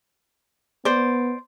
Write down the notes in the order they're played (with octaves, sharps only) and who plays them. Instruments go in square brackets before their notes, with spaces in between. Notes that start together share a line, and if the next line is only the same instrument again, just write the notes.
[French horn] B3 [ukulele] C5 D5